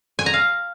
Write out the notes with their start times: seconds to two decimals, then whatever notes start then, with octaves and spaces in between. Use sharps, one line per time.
0.19 G#5
0.26 A#5
0.34 F5